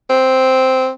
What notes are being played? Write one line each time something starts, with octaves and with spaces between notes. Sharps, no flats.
C4